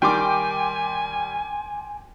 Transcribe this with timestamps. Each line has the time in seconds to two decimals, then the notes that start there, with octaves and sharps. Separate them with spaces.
0.02 D#3 G3 G5 G#5 C6 D6